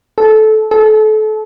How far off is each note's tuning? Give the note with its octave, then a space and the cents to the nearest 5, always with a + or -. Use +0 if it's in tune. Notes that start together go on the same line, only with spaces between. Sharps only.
A4 -20
A4 -30